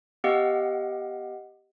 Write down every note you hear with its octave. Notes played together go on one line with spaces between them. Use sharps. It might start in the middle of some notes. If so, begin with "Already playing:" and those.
B3 G4 D#5 F5 F#5